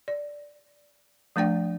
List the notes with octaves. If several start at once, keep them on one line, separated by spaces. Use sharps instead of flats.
D5
F3 A3 D4 D5 G5